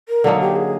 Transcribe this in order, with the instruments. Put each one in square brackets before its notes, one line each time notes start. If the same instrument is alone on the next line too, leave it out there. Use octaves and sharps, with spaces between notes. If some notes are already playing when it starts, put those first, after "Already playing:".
[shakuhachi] A#4
[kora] D3 F#3 A#3 D#4 [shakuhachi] A4
[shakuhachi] G4
G#4